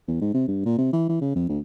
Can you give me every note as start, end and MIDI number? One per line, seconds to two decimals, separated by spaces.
0.08 0.18 40
0.21 0.31 44
0.34 0.44 48
0.48 0.65 43
0.65 0.76 46
0.78 0.90 48
0.93 1.05 52
1.09 1.18 52
1.21 1.34 49
1.36 1.47 41
1.49 1.59 38